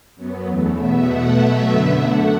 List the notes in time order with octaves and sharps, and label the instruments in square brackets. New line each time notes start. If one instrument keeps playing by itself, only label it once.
[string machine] F#2 F#3 B3
E2 E3 A3
E2 B2 B3 E5
B2 A3 F#5
B2 F#3 A3 E5
F#2 D3 B3 E5
F#2 D3 A3 F#5